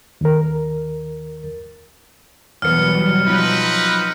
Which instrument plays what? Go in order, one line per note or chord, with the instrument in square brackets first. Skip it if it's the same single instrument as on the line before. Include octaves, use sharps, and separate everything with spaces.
[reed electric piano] D#2 A#4
[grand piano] E2 B3 [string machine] B2 F#3 G3 [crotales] F6 C#7
[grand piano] F3 F#3 [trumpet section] C4 D#4 B4 [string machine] B5